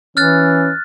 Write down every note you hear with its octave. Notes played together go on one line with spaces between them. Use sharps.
E3 C#4 F6 F#6 A6